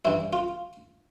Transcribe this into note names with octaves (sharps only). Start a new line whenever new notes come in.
G2 E3 E4
F4